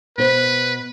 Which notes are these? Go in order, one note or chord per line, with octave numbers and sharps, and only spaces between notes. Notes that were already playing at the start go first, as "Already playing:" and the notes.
B2 B4 C5